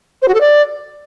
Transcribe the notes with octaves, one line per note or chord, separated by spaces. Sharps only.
C5
F#4
A4
D5